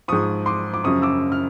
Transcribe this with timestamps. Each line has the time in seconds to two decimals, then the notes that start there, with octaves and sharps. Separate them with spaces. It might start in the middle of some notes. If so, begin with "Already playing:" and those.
0.08 G#2 F3 C#6 D#6
0.46 C6 D6
0.74 D6
0.84 F#2 C#3 F3 C#6 D#6
1.02 D6 E6
1.32 F6